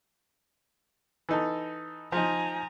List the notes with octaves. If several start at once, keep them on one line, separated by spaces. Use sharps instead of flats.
E3 D#4 A4
F3 D#4 G#5 A#5